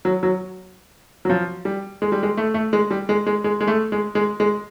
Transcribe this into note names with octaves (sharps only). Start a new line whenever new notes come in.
F#3
F#3
F#3
F3
G3
G#3
G3
G#3
A3
A3
G#3
G3
G#3
G#3
G#3
G#3
A3
G#3
G#3
G#3